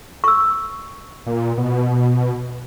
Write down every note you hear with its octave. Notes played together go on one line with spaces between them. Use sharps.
C#6 E6
A#2
B2